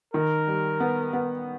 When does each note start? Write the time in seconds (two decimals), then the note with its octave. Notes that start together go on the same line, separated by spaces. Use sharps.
0.14 D#3 A#4
0.47 G3
0.80 B3
1.13 B3